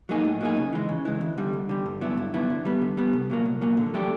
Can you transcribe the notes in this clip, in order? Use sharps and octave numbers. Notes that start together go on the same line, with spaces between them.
F#3 A#3 D#4 G#4
A2
F#3 A#3 D#4 G#4
C#3
E3 G#3
C#3
E3 G#3
D2
D3 G3
D2
D3 G3
G2
D3 F#3 B3 E4
G2
D3 F#3 B3 E4
D3
G3 B3
D3
G3 B3
C2
A#2 F#3 A#3
C2
A#2 F#3 A#3
D3
F#3 A3 D4 G4